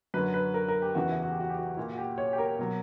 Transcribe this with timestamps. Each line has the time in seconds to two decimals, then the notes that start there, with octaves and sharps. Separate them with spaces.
0.14 F#2 D3 F#3 B4
0.34 B4
0.54 A#4
0.68 A#4
0.82 G4
0.95 E2 C#3 E3 F#4
1.09 E4
1.23 F#4
1.32 G4
1.40 F#4
1.50 G4
1.58 F#4
1.77 A#2 G3 E4
1.93 F#4
1.98 G4
2.18 C#5
2.33 G4
2.38 A#4
2.59 B2 F#3